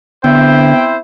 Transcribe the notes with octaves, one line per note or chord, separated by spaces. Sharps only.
D3 B3 C4 E4 C5 G5